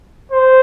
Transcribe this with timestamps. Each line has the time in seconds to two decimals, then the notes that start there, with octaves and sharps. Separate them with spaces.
0.32 C5